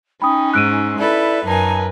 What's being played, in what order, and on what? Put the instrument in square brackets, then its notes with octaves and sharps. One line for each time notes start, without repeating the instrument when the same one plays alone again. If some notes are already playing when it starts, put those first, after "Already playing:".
[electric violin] C#4 D#4 [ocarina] G5 [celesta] B5 D#6
[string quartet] G#2 [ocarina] E6 [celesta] F#6 D7 D#7
[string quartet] E4 A4 B4 [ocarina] D5
[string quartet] F#2 D#4 G#5 [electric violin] A#4 B4 [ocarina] A5